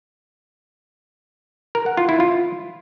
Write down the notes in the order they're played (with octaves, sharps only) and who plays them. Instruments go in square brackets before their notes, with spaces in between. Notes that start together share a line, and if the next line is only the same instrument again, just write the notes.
[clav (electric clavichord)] A#4
F#5
F4
E4
F4